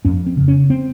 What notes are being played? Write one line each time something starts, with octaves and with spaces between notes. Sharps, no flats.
F2 C#4
C4
C#3
C#4
C4